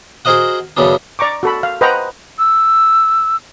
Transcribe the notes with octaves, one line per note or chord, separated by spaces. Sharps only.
F#4 G#4 A#4 C5 D#5 F#5
F#2 C#3 F#3 B3 D4
D5 A#5 C#6 D6
F#4 A4 B5
F5
B4 C5 D#5 F#5 G5 A#5
E6